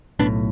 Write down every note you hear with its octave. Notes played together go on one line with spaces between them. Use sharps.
B1 A2 B3 D4